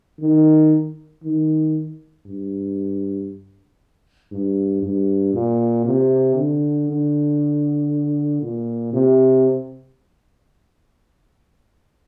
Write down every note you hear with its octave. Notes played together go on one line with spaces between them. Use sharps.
D#3
D#3
G2
G2
G2
A#2
C3
D3
D3
A#2
C3